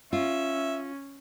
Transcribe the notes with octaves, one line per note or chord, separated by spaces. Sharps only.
C#4 F4 E5